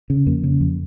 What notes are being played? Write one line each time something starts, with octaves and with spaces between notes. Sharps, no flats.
C#3
F2 A#3
C#3
F2